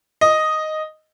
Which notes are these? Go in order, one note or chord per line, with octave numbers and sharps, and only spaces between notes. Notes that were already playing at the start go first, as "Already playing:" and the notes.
D#5